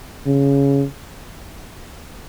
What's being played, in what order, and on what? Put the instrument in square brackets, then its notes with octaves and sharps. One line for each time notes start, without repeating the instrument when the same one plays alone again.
[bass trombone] C#3